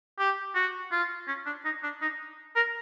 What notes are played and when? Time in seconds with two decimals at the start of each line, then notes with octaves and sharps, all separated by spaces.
0.19 G4
0.55 F#4
0.92 F4
1.28 C#4
1.46 D4
1.65 D#4
1.83 D4
2.02 D#4
2.56 A#4